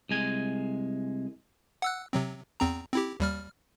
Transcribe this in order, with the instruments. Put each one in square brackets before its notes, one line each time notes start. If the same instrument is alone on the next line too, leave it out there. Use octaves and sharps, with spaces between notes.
[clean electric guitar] C2 G#3 G#5
[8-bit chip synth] F#5 E6 F#6
C3 F#3 C4
E2 C4 A#5
C4 E4 G4
D#2 G3 F6